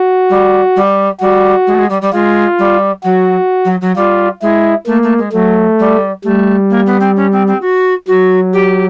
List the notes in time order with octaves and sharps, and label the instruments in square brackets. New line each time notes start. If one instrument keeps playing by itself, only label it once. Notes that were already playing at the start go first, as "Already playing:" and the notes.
Already playing: [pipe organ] F#4
[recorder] G3
G3
[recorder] G3 [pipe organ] F#4
[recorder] G#3
A3
G#3
G3
G3
[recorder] G#3 [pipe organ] F4
[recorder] G3
[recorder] F#3 [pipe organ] F#4
[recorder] F#3
F#3
[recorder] G3 [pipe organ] F4
[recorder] G#3 [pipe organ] E4
[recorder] A3 [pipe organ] A#3
[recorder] A3
G#3
[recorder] F#3 [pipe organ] A3
[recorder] G3
[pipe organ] G3 [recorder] A3
[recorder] A#3
B3
C4
C#4
C4
C4
F#4
[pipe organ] F#3 [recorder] F#4
[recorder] G4